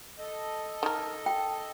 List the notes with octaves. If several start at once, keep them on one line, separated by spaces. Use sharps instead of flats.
A4 D#5
D#3 A#4
G5